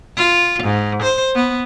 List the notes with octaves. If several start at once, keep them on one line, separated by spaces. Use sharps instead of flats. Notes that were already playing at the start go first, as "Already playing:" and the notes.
F4
G#2
C5
B3